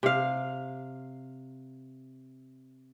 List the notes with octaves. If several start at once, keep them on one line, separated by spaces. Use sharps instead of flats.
C3 F5